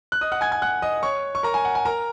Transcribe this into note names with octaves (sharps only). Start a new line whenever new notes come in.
F#6
D#5 D#6
F#5 F#6
G#5 G#6
G#5 G#6
F#5 F#6
D#5 D#6
C#5 C#6
C#6
A#4 A#5
G#5
F#5
G#5
A#4 A#5